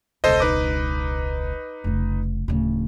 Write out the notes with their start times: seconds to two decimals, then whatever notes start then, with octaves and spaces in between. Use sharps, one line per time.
0.24 E1 C#2 A4 C5 D#5
0.40 D#4 B4 D6
1.84 F1 C#3
2.48 D1 C#3